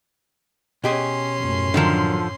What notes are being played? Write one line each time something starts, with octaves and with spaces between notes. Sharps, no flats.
B2 C#4 G4 G#4 C6
F#2 A2
D3 D#3 F3 F#3 A#4